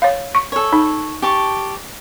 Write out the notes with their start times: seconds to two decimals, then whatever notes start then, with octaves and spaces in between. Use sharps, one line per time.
0.02 C#5 F5
0.35 C#6
0.52 A4 C#5
0.73 D#4
1.22 G4 A5 C#6